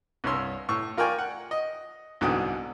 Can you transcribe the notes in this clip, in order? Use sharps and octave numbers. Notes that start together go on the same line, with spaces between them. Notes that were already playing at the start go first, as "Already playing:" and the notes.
C2 G2 C#5 C6 E6
A2 C#6 E6
F4 A#4 D5 G5 G#5 C#6
F#5
D#5
C2 G#2 B2 D3 G5 D#6